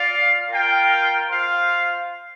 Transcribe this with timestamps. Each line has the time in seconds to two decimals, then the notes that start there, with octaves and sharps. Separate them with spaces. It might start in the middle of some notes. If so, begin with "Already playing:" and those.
Already playing: F4 D5 F5
0.50 F4 A#4 G5
1.29 F4 C5 F5